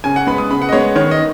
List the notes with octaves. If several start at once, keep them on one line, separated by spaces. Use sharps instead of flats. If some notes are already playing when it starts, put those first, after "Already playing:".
C#3 G#5
F#5
G#3 B3 B5
D#6
C#3 B5
F#5
D#5
G#3 B3 C#5
D#3 C#5
D#5